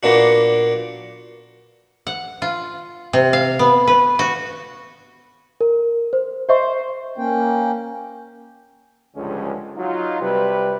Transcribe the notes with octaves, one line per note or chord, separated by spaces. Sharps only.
A#2 A#3 B3 D4 F#4
F#5
F4
C3
F5
B3
B4
F#4
A#4
C5
C5 D#5 E5 C#6
A#3 C#4 G5
C#2 G2 D3 F3 G#3 C#4
F#3 D#4 F4
C3 G3 B4